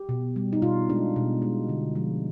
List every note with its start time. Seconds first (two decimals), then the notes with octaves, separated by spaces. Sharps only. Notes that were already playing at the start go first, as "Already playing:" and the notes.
Already playing: G4
0.09 B2
0.36 G3
0.53 D#4
0.62 B2 F4
0.90 G#3 D4
1.16 B2
1.42 G#3
1.69 D3
1.95 F3 G#3